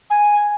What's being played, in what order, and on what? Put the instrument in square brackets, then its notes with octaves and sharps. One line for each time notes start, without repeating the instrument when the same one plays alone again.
[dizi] G#5